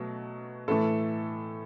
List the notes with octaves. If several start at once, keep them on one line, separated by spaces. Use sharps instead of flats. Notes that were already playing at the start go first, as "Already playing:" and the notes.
Already playing: B2 F#3 A3
A2 E3 A3 A4